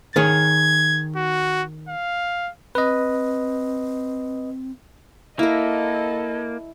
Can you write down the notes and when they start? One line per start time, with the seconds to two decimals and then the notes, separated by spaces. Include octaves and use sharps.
0.16 D#3 G#4 C#5 G#6
1.17 F#4
1.89 F5
2.75 C4 B4 D#5
5.39 A#3 E4 A4 A#4 D#5